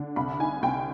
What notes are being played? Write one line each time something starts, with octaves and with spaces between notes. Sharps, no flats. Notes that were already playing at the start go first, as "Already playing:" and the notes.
Already playing: D3
C2 B5
D#4 G#5
C2 G5